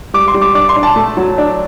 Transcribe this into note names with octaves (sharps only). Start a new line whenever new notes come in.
G3 D6
C6
G3
D6
D4 D6
C6
D4
A5
A3
F#3
D4